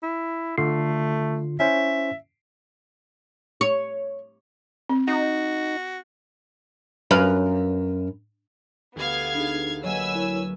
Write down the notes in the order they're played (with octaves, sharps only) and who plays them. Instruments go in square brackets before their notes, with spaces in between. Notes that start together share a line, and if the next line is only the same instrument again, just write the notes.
[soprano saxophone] E4
[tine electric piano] D3 F4 C7 [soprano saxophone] A3
[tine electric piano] C#4 E4 C5 [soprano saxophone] E5
[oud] C#5
[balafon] C4
[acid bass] D#4 [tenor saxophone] F#4
[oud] F#2 B4 F5
[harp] D2 G4 [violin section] B3 F5 G#6
[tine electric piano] D4 D#4 G#4
[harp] F#3 A#3 [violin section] B4 G#5 E6 [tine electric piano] C#5 D#5 F#5
[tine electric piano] E4 A#4 C#5